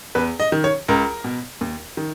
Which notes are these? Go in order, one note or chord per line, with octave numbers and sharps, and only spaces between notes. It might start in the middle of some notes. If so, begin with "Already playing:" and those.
E2 B4
D#5
D#3
C#5
C#2 A#4
B2
D#2
D#3